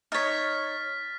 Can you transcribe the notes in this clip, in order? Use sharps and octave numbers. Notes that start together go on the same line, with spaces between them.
D#4 C#5 F6 A6 B6